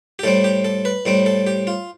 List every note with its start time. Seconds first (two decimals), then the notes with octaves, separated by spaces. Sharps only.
0.19 G4
0.23 A2 G3 C4 A4
0.44 G4
0.65 A4
0.85 B4
1.05 A2 G3 C4
1.26 A4
1.47 G4
1.67 F4